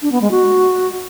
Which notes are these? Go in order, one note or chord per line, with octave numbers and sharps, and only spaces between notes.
D4
B3
G#3
F#4